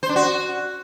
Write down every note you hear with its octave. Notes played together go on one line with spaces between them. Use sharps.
C5
D4
F#4